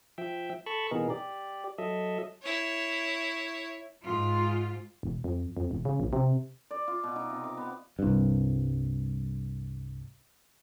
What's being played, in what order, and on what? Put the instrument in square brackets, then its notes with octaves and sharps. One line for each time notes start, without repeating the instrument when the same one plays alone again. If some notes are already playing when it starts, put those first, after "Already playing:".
[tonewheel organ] F3 E5 G5
A4 A5 B5 C#6
B2 E3 B3 D#4 G#4 A#4
G4 D5
F#3 A4 D#5 E5
[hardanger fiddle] E4 C#5
[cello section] G#2 F4
[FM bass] E1
F2
F2
E1
C#3
A#1
C3
[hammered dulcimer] D5
F4
B2
D#4
C3
D6
B3
[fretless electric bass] C2 G2